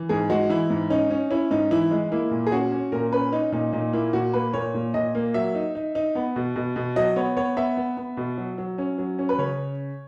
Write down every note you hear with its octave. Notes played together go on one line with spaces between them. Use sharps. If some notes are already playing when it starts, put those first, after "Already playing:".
Already playing: E3
G#2 G#4
G#3 F#4
E3 E4
G#2
C#4 D#4
C#4
C#4 E4
G#2 D#4
E3 E4
G#3
A#3 E4
A#2
G#4
C#4 F#4
C#4
A#2 A#4
C#4 B4
C#4 D#4
A#2 D#4
A#2 D#4
A#3 E4
A#2 F#4
A#3 B4
A#2 C#5
A#2
A#2 D#5
A#3
F#3 E5
D#4
D#4
D#4
B3
B2
B2
B2
F#3 D#5
B3 C#5
B3 C#5
B3 E5
B3
B3
B2
F#3
F#3
C#4
F#3
C#4
B4
C#3 C#5